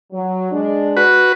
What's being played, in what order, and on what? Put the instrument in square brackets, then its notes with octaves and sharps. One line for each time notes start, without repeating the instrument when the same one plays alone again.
[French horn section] F#3
G#3 D4
[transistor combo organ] F#4 B4